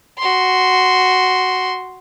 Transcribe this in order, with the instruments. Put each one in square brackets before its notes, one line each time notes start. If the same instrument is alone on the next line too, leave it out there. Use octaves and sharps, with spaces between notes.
[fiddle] F#4 C6